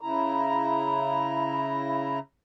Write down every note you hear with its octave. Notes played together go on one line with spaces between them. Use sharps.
C#3 E4 A#5